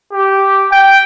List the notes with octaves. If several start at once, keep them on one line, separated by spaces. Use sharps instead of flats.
G4
G5